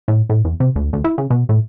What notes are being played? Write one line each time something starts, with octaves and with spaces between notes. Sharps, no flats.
A2
A2
E2
C3
D2
D2
E4
C#3
B2
A2